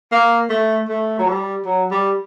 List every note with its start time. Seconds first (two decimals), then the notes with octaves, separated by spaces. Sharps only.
0.12 A#3
0.50 A3
0.89 A3
1.19 F#3
1.27 G3
1.66 F#3
1.91 G3